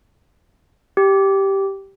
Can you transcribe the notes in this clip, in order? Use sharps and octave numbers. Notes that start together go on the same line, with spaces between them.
G4